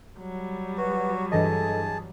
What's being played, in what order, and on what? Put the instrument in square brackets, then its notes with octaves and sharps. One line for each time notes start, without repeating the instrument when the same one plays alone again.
[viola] F#3 G3
[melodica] F#4 [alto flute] B4
[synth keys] G2 E3 D#5 [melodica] G#4 A5 [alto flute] A4